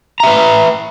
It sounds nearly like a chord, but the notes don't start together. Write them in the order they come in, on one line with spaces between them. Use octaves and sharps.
A#5 E5 B4